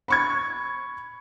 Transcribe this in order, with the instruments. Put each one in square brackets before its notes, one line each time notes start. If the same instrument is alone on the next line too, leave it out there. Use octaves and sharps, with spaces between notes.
[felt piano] B5 C#6 G#6